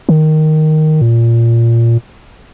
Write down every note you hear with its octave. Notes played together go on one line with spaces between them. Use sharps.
D#3
A#2